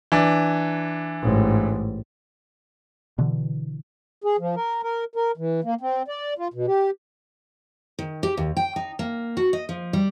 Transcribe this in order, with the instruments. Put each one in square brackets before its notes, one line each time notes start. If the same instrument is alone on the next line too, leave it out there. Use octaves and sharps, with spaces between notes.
[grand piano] E3 D4
[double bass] A1 G#2
[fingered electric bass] B2 D3 E3
[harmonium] G#4
F3
A#4
A#4
A#4
E3
A#3
C4
D5
F4
B2
G4
[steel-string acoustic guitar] D#3
G4
D#2
G5
D#4
A#3
F#4
D#5
F3
G3